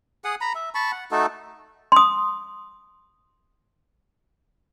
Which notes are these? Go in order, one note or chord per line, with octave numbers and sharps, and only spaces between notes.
G#4 F#5 D#6
A#5 B5
E5
A5 B5 C#6
F#5
A3 D#4 F#4 A4
C6 D#6